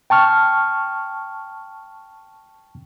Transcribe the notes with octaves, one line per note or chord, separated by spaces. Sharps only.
G5 A5 C#6 F6